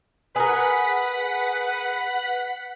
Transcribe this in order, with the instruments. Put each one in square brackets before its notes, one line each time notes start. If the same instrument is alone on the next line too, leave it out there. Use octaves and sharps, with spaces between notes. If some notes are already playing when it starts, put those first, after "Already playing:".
[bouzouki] G#4 A#4 [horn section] B4 [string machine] F#5 F#6 B6